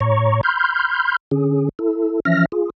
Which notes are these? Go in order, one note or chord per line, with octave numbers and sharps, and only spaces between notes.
A2 C#5 A#5 C#6
B5 C6 F6 G6
D3 C#4 G#4
E4 A4
E3 F3 C#4 E5 F6 A#6
F4 G#4